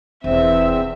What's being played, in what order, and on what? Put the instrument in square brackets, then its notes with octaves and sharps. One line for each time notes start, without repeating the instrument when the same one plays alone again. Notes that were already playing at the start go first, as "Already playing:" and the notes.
[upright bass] E1 E4 [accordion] E2 C4 [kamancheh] E5